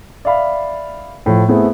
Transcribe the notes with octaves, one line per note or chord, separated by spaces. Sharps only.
D5 E5 F5 B5
A2 F3
A3 B3 C4 E4 G#4